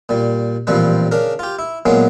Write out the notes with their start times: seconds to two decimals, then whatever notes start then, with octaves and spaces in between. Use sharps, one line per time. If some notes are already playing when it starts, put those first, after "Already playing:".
0.09 A#2 G3
0.67 A1 A#2 F3 G3 C4 B4
1.11 C#3 D4 A#4
1.39 F4 G4
1.59 E4
1.86 A#2 F#3 G#3 A#3 B3 C#4